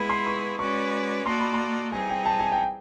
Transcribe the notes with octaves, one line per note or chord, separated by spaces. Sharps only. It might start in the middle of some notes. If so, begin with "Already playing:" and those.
Already playing: G#3 B3 E4 G#4 B4 B5
C6
C#6
G#3 C#4 F#4 B4 D5 C#6
A#3 D#4 F#4 A4 D5 C6
B5
C6
E3 G3 C4 D#4 G#4 G#5
G5
A5
G#5
G5